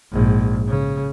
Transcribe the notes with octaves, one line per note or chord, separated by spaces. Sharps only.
A#1 G#2
C#3